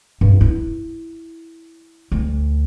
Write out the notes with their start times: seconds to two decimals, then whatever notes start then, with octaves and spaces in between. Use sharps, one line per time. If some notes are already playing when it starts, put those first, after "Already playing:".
0.21 G2
0.41 E4
2.12 D2